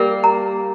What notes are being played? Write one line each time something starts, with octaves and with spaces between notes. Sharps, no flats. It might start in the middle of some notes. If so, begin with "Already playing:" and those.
Already playing: G3 A#3 A#4
A#5